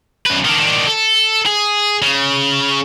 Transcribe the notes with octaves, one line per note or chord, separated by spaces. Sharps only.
F#2 B4
D#3 D4
A4
G#4
C#3